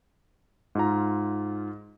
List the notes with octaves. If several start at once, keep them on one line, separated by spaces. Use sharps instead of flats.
G#2 F4 A#5